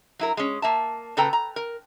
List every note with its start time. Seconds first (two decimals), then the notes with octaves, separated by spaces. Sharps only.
0.19 F#3 E4 A#4
0.37 G#3 C#4
0.62 A#3 E5 A5
1.17 A#2 C#3 A4 B4 G5 A#5
1.33 A#5
1.56 A#4